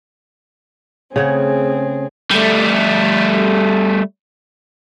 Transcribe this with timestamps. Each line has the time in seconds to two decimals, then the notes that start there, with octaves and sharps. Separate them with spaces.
1.16 C#3 A3 C4 G#4 C#5 F#5
2.32 G3 A3